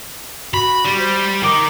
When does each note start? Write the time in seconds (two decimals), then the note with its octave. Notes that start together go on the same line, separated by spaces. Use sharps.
0.54 F#4 B5
0.85 G3
0.99 C5
1.44 A#4 G5 D6